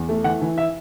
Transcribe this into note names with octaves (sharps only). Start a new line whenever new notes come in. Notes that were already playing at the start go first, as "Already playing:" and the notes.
Already playing: E2
A3
E3 F#5
E3
E5